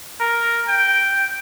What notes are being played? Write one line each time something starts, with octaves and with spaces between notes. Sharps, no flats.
A#4
G5